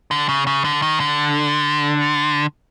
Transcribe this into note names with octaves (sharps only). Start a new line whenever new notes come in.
D3
C#3
C#3
D3
D#3
D3